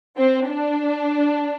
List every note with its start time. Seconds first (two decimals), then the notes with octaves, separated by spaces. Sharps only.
0.17 C4
0.47 D4